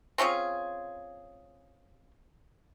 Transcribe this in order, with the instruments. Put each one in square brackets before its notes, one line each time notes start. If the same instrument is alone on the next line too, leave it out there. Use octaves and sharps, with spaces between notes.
[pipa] C4 C#4 F4 G#4